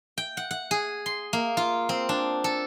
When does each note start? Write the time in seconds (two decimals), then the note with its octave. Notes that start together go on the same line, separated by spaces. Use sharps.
0.18 G5
0.37 F#5
0.51 F#5
0.71 G#4
1.06 C6
1.33 A#3
1.57 F4
1.89 C4
2.09 D4
2.44 A4